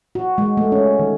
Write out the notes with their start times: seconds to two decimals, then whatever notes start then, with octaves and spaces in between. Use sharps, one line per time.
0.15 F#4
0.38 G#3
0.57 A3
0.72 C#4
0.99 D#3